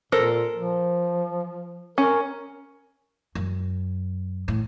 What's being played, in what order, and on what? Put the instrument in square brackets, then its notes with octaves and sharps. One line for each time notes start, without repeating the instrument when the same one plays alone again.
[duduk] A#2 [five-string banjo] A4 A#4 C5
[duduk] F3
[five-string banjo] C#4 [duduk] A#4
[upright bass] F#2
A2